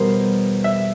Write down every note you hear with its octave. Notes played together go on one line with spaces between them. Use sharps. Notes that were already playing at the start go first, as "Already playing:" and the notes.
Already playing: E2 B2 G3 A#4 C5
E5